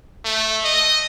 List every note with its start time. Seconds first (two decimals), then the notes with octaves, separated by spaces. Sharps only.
0.24 A3
0.65 D#5